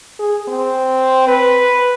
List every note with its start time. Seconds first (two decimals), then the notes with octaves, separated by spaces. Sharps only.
0.19 G#4
0.48 C4
1.28 B4